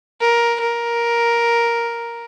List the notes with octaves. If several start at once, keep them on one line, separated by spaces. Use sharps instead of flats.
A#4
A#4